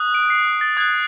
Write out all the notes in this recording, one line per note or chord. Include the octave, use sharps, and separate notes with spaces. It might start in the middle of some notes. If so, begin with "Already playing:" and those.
Already playing: D#6 F#6
D7
C7
A6
D#6 F#6 G#6